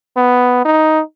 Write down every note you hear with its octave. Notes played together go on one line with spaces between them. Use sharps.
B3
D#4